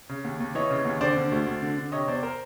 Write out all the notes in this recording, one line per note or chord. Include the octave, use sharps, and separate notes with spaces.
C#3
D#2
D#2
E3 C#5 D#5
C#3
D#2
D3 C5 D5
D3
D2
D2
D3
D3
C3 C#5 D#5
E2 C5 D5
A#4 C5